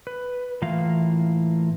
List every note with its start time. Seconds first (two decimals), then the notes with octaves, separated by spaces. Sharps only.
0.07 B4
0.62 A2 E3 A#3 F4 F5